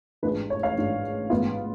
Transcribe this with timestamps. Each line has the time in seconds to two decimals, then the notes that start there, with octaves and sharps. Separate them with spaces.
0.23 A1 G#2 G#3 D4 F4 B4
0.50 C#5
0.63 C#5 F5
0.77 A1 G#2 G#3 D4 F4
1.30 A1 G#2 G#3 B3 F4